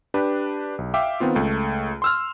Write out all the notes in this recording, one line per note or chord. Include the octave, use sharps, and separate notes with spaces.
D4 G4 B4
B1
E5 F5 G5 D6
D#3 B3 C4 F4
C#2 A3
C6 E6 F6